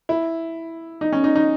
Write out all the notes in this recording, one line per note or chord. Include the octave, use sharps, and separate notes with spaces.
E4
D#4
C#4
D#4
D#4